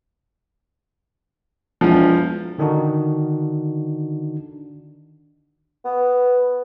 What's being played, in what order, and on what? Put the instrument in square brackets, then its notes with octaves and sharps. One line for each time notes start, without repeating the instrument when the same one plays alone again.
[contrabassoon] E1 [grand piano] F3
[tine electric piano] D3 D#3 D4 D#4 F#4
[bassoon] B3